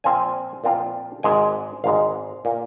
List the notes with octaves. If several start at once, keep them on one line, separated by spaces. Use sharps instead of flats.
A#2 F3 C4 F4 G#5
A#2 F3 C4 F4
G#1 G#2 G#3 G#5
G#1 G#2 G#3 F5
A#2 A#3